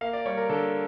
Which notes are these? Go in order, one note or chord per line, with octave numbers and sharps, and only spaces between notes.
A#3 F5
D5
G3 C#5
A#4
D3 A4